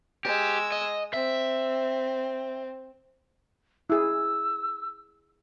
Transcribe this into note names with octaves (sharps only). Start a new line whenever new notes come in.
G#3 G4 E6
D#5
C4 E5
E4 G#4 E6